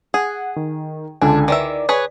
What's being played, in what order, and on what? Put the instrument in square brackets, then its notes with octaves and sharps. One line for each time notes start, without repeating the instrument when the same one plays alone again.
[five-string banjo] G#4 [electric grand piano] F#5
[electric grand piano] D#3
[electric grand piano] C#2 D3 G#5 [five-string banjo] D4
[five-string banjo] D#3 E3 E5 [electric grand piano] D5
[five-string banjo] G#4 B4 C#5